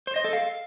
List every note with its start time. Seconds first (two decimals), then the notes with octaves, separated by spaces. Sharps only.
0.07 C5
0.16 D#5
0.24 A4
0.33 F5